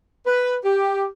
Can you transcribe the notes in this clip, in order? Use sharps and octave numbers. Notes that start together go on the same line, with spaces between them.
B4
G4